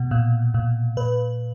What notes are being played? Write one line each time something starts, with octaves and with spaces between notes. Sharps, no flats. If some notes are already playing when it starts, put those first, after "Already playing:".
Already playing: B2
A#2
A#2
A#2 B4